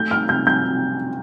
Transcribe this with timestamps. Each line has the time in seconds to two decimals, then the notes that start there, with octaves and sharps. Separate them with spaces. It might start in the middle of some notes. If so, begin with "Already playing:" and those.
Already playing: A3 G6
0.11 F6
0.29 C3 G6
0.47 G6
0.65 C3